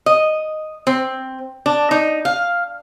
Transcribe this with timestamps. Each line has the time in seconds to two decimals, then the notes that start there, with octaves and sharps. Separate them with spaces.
0.06 D#5
0.87 C4
1.66 D4
1.91 D#4
2.25 F5